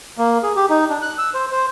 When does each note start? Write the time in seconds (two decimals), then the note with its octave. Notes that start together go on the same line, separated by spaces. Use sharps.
0.18 A#3
0.43 G#4
0.56 G4
0.70 D#4
0.89 D4
1.02 F#6
1.18 E6
1.34 C5
1.51 C5